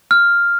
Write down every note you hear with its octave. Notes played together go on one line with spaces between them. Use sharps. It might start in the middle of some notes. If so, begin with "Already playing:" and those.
F6